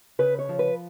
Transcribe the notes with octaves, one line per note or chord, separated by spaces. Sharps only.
C#3 B4
C#5
F3
B4